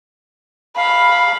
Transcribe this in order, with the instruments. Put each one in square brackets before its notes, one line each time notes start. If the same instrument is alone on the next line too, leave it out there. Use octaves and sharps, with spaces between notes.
[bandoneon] F5 [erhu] B5